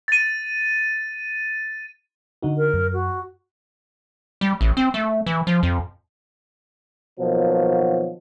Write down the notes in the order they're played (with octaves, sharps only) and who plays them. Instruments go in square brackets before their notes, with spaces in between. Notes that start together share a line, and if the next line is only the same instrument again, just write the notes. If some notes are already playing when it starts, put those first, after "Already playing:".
[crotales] A6 D#7
[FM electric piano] D3 D#4 F#4
[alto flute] A#4
[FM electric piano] F#2
[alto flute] F#4
[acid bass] G3
A1
C4
A3
E3
F3
F2
[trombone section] B2 D#3 F3 F#3 A#3